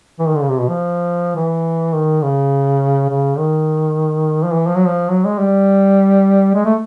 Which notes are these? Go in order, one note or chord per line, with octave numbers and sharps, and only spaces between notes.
E3
D#3
D3
C#3
C3
B2
F3
E3
D#3
C#3
C#3
D#3
F3
E3
F3
F#3
F3
F#3
G#3
G3
G#3
A3